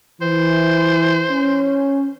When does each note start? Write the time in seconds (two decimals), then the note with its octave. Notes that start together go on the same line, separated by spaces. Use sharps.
0.22 E3 C5
1.30 C#4